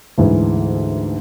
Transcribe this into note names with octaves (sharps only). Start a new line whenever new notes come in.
D2 G#2 E3